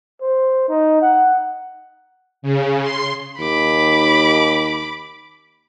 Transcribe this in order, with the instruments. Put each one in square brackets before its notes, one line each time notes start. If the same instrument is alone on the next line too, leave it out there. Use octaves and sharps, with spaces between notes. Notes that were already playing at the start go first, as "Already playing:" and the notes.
[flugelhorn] C5
D#4
F#5
[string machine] C#3
C6
[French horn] D#2 [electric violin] B5 D6